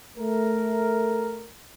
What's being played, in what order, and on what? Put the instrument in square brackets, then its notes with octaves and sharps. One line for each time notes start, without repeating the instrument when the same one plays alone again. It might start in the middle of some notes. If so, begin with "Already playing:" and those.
[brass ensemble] A3 A#4